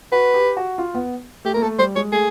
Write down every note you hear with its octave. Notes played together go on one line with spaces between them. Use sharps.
F#4 B4
G4
F#4
F4
B3
A3 G4
A#3 A#4
A3 A4
G3 C5
G#3 C#5
A3 G#4